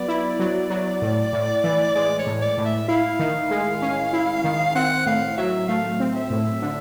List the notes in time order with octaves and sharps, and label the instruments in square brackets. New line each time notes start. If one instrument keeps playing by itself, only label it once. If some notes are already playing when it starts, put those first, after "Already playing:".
Already playing: [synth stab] F#3 B3 [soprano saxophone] D5
[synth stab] E4
F#3
F#3
A2
A2
E3
[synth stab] G#3 [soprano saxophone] D5
[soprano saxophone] C#5
[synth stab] A2
[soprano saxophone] D5
[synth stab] A2
[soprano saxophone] E5
[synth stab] E4 [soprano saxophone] F5
[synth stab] D#3
G#3
C#4
E4
D#3
[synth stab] C4 [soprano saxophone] F#5
[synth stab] A2 [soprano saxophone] F5
[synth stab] F#3 [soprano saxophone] E5
[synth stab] A3 [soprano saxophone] F5
[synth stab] C4
[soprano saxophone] E5
[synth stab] A2
D3